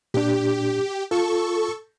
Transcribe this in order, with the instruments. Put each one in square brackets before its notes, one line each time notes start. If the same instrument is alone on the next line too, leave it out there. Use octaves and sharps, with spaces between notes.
[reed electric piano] A#2 D4 [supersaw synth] G4
[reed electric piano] F4 [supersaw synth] A4 C#6